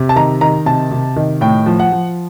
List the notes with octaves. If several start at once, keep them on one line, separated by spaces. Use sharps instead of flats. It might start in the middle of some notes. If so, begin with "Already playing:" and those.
Already playing: C3
A5
D#3 A#5
D#3 A#5
C3 A5
C3
D#3
A2 G5
F3
F#5
F3